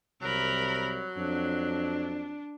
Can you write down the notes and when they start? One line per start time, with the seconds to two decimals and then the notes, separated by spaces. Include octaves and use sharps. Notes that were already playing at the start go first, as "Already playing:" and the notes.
0.22 C2 F#3 A#4 B5
1.17 F2 D4